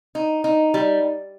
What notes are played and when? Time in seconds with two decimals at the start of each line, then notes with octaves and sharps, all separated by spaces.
0.15 D#4
0.44 D#4
0.74 G3